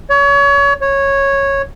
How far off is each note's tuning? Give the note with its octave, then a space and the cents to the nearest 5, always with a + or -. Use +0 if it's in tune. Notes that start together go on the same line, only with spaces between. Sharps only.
C#5 +30
C#5 -10